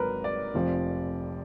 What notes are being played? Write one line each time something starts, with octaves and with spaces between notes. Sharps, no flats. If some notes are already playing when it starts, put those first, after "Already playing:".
Already playing: G#1 G#2 F#3 A#4 B4
D5
F1 F2 F3